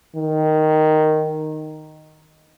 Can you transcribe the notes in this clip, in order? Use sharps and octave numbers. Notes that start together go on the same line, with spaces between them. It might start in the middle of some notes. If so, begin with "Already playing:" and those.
D#3